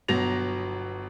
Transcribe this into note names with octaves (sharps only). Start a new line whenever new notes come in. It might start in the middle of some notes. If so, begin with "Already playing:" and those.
G1 B2 F#3 A#6 F7